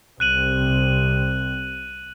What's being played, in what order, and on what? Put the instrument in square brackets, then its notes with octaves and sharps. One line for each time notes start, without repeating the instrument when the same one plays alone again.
[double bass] C2 C3 [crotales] F#6 D#7 F#7